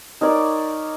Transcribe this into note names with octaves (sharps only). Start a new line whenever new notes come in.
D#4 A#4 C#5 D5